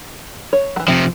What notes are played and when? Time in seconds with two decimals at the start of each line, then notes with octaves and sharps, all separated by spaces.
0.53 C#5
0.76 E3 F#3
0.88 C3 F3 C4 E5